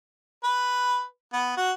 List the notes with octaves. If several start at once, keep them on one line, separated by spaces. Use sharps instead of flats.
B4
B3
F#4